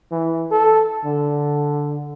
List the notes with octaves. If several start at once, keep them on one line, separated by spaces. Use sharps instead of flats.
E3
A4
D3